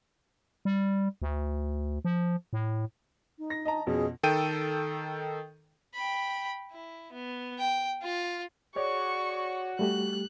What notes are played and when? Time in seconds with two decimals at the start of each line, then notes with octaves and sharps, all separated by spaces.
0.65 G3
1.22 D2
2.05 F3
2.53 A2
3.38 D#4
3.50 A#6
3.65 D#5 A5 A#5
3.87 F2 B2 C#4 G#4
4.23 D#3 A4 G5 D#7
5.94 G5 B5
6.72 E4
7.13 B3
7.59 G5
8.02 F4
8.76 F#4 G#4 C#5 D5 C#6
9.79 G3 A3 G4 F#6